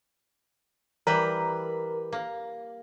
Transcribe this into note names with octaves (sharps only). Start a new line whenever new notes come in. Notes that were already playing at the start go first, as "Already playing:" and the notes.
E3 G3 A#4 B4
A#3